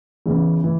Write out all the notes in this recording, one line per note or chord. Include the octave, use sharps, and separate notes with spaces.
E2 C#3 E3
E3